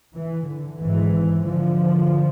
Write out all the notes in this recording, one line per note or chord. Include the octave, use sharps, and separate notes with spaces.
E3
D3
G#1 G#2 E3
D3 F3